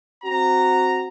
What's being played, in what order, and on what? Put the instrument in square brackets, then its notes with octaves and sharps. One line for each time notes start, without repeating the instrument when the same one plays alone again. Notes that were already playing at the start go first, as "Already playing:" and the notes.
[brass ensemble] C4 F#4 A#5